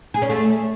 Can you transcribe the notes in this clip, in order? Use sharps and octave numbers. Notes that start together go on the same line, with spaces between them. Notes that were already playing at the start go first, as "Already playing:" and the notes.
G#4
C#4
A3